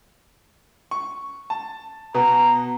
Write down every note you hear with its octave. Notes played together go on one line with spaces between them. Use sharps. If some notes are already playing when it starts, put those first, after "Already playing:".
C#6
A5
B2 B3 A#5